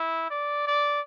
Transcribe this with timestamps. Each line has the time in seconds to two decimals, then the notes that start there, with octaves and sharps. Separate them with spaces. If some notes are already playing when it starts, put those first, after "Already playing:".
Already playing: E4
0.30 D5
0.67 D5